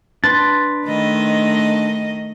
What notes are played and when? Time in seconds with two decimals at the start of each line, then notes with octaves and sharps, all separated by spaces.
0.24 D4 B4 C6 A6
0.86 D#3 A3 D#5